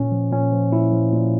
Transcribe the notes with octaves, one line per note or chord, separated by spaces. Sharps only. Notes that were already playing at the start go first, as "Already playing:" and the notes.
Already playing: A#2 C#4
F3
A#2 C#4
F3
A#2 E4
F3
A#2